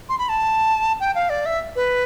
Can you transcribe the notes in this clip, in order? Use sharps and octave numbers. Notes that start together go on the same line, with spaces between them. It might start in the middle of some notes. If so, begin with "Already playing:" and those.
C6
B5
A5
G5
F5
D5
E5
B4